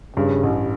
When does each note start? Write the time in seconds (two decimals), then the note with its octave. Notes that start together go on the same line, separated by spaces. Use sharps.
0.17 G2 C#3
0.43 A1